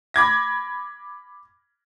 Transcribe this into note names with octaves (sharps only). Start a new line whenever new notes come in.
B5 D6 G#6 A#6